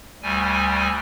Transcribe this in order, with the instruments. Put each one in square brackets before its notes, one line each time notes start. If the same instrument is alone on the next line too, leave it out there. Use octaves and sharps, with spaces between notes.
[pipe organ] D2 G3 G#5